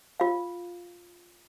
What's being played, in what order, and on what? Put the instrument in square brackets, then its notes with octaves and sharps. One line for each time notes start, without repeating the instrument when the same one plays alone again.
[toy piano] F4 F5